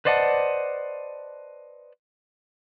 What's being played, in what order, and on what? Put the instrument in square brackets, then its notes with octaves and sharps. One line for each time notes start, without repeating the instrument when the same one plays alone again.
[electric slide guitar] B4 C5 D5 D#5 F#5 A5